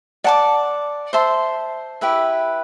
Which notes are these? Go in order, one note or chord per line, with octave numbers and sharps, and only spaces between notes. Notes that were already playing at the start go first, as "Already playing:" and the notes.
D5 F#5 A5 D6
C5 E5 A5 C6
E4 G4 B4 E5